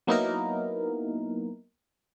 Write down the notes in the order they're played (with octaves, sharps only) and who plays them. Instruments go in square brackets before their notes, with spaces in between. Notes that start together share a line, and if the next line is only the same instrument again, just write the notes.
[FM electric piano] F#3 A#3 B3 D#4 E4 A#4